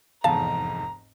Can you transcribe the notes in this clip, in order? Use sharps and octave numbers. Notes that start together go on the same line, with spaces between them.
F1 E2 G#2 F5 A5 A#5